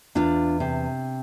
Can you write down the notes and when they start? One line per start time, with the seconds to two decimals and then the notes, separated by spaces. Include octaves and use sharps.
0.15 E2 D4 F4
0.60 C3